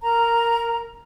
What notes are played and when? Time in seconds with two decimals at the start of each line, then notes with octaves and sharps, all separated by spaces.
0.01 A#4 A#5